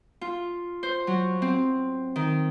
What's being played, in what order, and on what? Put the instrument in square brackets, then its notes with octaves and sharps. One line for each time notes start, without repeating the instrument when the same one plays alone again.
[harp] F4
C5
F#3
C4
D#3